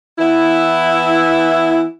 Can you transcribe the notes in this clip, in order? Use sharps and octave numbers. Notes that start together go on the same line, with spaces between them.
E3 B3 E4